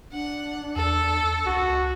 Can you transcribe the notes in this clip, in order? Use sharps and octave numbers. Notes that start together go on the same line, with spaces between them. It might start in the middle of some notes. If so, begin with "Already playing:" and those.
D4 F#5
E2 A4
C#2 F#4